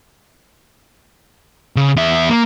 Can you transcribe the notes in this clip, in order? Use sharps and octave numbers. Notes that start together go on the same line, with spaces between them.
C#3
E2 E5
A#3